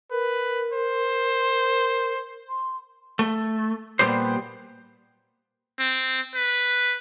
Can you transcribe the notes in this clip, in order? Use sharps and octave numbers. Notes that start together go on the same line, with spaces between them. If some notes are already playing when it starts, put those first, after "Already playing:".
A#4 B4
C5
C6
A3
A#2 G3 B3 G4 C5
C4
B4